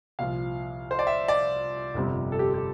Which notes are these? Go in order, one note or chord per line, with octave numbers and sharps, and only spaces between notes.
C2 A#2 F3 F5
C5
D5
E5
D5
G1 F2 C3 G3 C4
A4
G4
G4